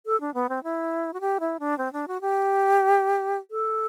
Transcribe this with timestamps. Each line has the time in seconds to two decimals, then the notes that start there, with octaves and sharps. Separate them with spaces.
0.06 A4
0.21 D4
0.34 B3
0.49 C4
0.64 E4
1.14 F#4
1.21 G4
1.40 E4
1.60 D4
1.78 C4
1.93 D4
2.08 F#4
2.21 G4
3.51 A4